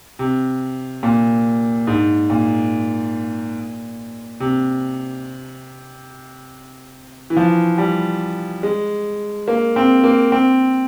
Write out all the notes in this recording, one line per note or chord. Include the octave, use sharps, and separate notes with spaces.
C3
A#2
G#2
A#2
C3
E3
F3
G3
G#3
A#3
C4
A#3
C4